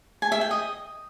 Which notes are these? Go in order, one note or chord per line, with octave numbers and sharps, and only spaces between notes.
G#5
E5
G5
D#5